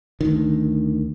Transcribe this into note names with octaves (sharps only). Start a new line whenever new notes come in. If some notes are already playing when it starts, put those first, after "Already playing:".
D2 D#3